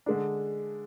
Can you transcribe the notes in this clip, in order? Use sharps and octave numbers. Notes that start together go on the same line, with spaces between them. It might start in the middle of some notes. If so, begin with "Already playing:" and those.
D3 G#3 D4